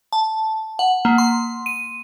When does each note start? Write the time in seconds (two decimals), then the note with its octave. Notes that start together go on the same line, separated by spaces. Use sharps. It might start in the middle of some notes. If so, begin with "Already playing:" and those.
0.13 A5
0.79 F#5
1.05 A#3
1.18 C6
1.66 D#7